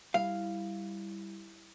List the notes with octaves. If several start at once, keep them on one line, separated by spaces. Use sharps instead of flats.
G3 E4 F5